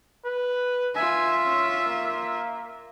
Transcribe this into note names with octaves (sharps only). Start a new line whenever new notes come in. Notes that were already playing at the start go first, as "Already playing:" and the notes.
B4
F4 E5 G#5
C#4
A#3